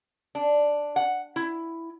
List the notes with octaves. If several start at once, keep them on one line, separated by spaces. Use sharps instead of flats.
D4
F#5
E4